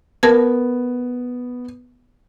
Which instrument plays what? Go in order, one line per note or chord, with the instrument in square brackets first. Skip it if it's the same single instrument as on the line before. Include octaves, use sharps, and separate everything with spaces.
[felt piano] B3 [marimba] A#4 A5 G#6